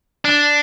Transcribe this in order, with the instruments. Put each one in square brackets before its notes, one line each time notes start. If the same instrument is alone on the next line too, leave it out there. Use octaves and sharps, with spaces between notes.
[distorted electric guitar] D4